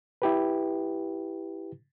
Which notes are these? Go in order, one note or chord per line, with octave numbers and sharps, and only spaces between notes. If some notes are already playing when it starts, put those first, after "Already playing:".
E4 G4 B4